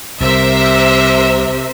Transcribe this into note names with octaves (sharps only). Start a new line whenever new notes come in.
C2 C3 A#4 C5 E5